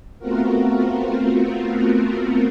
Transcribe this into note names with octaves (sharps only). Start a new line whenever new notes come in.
A3 B3 C4 F4 F#4 A#4